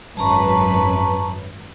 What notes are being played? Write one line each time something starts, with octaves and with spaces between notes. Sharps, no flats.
G#1 F#2 B4 A5 A#5 C#6